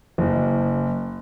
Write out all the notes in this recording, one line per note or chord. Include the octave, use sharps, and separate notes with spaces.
F#1